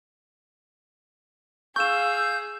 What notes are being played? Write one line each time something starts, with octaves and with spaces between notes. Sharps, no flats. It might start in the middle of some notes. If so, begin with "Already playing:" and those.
G#4 F5 C#6 E6 G6 E7